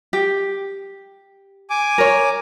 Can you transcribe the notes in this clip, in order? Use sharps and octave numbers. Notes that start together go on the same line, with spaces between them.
G4
G#5 D6
A#4 C#5